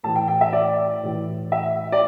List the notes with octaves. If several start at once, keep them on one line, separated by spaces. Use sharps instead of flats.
A2 E3 A5
G5
G5
E5
D5
A2 E3
E5
D5